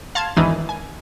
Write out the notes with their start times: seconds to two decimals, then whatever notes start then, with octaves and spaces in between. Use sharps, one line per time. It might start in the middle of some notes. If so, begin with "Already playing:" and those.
0.15 F5 A5 C6 G#6
0.36 G#1 E2 D#3 E3 D4 D#7
0.69 G#5